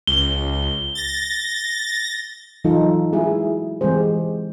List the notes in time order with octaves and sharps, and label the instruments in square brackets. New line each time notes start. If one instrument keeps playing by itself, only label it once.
[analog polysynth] C#2 [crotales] G7
[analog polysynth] A6 A#6
[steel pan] E3 F#3 D#4 F4 A4
G#3 E4 F#4 G#4
E3 G#3 C4 G4 G#4 C5